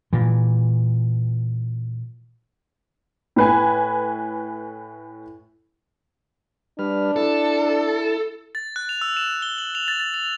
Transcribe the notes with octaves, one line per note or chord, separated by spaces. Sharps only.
A#2 E3
A2 B4 G#5
G3 D4 B4 F6
E4 A4
A6
F#6
F7
E6
E7
G7
F#7
F7
A6
A6
F7